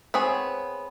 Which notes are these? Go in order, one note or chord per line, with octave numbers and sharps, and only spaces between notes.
B3 C4 G#4 C#5